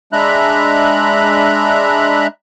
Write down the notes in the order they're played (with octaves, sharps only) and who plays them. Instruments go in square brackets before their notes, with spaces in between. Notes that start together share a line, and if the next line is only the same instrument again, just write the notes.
[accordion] G#3 D4 E5 A#5 B5 F#6